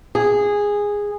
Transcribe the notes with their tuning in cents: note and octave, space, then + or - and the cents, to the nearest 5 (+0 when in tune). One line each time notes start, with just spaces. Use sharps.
G#4 -10